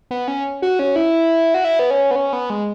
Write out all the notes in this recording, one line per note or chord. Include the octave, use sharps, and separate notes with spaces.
B3
C#4
F#4
C#4
E4
F#4
E4
B3
C#4
B3
C#4
B3
G#3